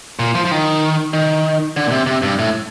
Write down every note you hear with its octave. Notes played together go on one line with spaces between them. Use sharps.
A#2
F3
F3
D#3
D#3
D3
A#2
C3
C3
G2
A2